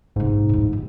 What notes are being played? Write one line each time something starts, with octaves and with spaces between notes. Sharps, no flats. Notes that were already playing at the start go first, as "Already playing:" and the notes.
A#1 G#2 C3
F2 A2
G1